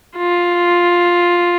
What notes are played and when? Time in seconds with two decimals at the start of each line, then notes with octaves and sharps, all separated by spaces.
0.17 F4